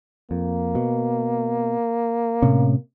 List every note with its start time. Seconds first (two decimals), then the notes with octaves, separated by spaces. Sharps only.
0.31 F2 A#3
0.75 B2
2.42 A2 C3 C#4